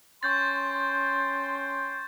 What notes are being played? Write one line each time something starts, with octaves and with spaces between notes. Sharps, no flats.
C#4 G5 C6 C#6 G6 A6